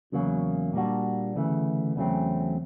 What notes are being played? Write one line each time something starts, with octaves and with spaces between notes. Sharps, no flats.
E2 C#3 F#3 A#3
A#2 G3 A#3 D4 F#4
D2 C#3 E3 A3
E2 C#3 F#3 A3 C4